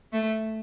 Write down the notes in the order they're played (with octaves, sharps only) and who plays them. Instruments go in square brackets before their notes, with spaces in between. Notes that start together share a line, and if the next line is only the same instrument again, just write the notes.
[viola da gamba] A3